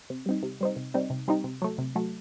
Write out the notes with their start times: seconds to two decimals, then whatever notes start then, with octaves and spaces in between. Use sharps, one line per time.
0.10 C3
0.26 G3 C4 D#4
0.43 C3
0.61 G3 C4 D#4
0.76 C3
0.94 G3 C4 D#4
1.10 C3
1.28 G3 C4 D#4
1.44 C3
1.62 F#3 A3
1.78 C3
1.96 F#3 A3